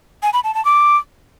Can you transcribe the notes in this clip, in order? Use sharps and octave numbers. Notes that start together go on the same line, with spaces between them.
G#5
B5
A5
A5
D6